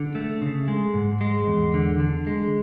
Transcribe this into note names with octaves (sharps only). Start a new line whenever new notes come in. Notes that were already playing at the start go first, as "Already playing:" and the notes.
Already playing: D3
A3
C#3
G#3
G#2
G#3
E2
D3
D3
G#3